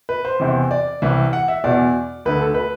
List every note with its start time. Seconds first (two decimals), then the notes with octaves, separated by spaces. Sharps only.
0.09 B4
0.25 C5
0.40 E2 C3 E3
0.71 D5
1.02 C2 C3 E3
1.33 F#5
1.48 E5
1.64 E2 B2 D5
2.25 D2 D3 B4
2.41 A4
2.54 B4